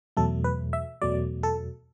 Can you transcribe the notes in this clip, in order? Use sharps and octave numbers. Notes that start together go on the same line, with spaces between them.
E2 B2 F#3 A3 A4
B4
E5
E2 B2 F#3 A3 D5
A4